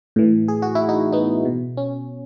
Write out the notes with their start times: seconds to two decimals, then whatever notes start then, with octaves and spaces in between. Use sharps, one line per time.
0.16 A2 E3
0.48 G#4
0.62 F#4
0.75 E4
0.89 D#4 F#4
1.12 B3 D#4
1.45 B2
1.77 C#4